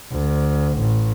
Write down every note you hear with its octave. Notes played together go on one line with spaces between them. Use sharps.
D2
A1